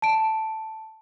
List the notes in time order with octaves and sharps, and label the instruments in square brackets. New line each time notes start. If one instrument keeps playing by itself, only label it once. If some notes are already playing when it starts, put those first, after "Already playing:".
[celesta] A5 D7